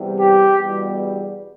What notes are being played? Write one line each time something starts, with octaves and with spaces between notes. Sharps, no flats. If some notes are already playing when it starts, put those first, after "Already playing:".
Already playing: E2 C3 G3
G4
E2 B2 G3